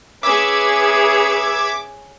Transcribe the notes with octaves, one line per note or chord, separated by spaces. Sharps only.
C#4 G#4 B4 E5 D6 E6 G#6